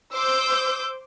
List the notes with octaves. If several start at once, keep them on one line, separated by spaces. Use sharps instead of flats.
C5 D6 E6 G6